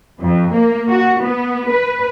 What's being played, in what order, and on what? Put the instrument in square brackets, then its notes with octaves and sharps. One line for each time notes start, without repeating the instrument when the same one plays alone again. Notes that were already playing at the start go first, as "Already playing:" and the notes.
[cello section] F2
A#3
F#4
B3
B4